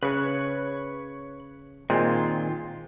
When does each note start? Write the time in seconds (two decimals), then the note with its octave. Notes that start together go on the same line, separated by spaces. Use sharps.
0.03 C#3 B4 C#5 F#6
1.90 A#2 D#3 G#3 C4 F4